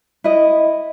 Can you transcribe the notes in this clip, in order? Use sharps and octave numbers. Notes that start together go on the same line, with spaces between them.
E4 D#5